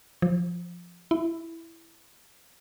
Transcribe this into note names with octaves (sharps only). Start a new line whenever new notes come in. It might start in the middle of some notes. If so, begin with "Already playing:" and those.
F3
E4